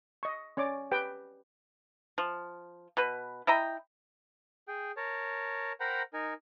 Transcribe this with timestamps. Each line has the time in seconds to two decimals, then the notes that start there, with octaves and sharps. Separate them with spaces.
0.23 D#5 C#6
0.57 C#4 C#5 D5 D6
0.91 G4 B4 G5
2.18 F3
2.97 B2 B4
3.47 E4 D#5 G5 A#5
4.68 G#4 G5
4.97 A#4 C#5 A5
5.80 A#4 C5 F#5 G5 A#5 B5
6.13 D#4 A#4 G#5